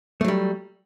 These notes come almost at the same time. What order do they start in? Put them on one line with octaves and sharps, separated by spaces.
A3 F#3 G3